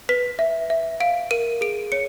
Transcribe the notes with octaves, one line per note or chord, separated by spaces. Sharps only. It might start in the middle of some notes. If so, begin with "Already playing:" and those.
B4 B6
E5
E5
F5 D7
A#4 D#7
G#4 D7
C#5 C#7